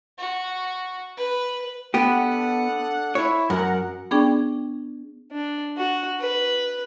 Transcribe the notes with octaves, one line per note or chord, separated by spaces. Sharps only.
F#4
B4
B3 D4 G4 A4 F#5
E4 C#5
F#2 A#4 F#5
B3 C#4 D4 G#4 D5 G5
D4
F#4
B4